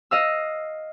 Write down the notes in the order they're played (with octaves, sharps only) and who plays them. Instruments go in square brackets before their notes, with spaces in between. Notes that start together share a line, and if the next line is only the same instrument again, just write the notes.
[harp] D#5 F5 E6